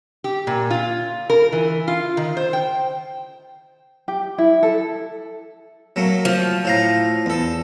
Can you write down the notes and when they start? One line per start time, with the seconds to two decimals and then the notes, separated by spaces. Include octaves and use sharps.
0.24 G4
0.47 A#2
0.70 F4
1.30 A#4
1.52 E3
1.88 F4
2.17 D#3
2.37 C5
2.53 G5
4.08 G4
4.38 E4
4.63 A4
5.96 F#3 A3 A#3
6.25 F3
6.65 A2 F5 A#5
7.26 E2 A4